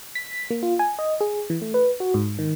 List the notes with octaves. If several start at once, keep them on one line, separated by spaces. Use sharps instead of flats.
B6
A#3
F4
G#5
D#5
G#4
E3
A3
B4
F#4
G#2
D#3